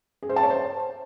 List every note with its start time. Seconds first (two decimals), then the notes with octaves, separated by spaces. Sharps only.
0.23 G#4
0.29 C5
0.36 A5
0.43 C#5
0.50 C5